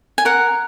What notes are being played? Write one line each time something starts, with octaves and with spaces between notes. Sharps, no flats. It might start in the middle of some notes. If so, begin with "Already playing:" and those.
G#5
A#4 F#5